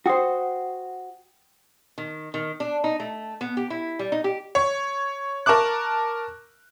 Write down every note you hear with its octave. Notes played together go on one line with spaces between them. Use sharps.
F#4 C5 F#5 G5 D#6
D#3
D#3
D4
D#4
A3
B3
G4
E4
G3
D#4
G4
C#5
A#4 A5 C#6 D6 F#6